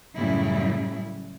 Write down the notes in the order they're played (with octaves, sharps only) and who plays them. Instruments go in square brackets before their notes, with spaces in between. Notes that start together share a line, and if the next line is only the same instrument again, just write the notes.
[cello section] F#2 A2 C#3 G3 E4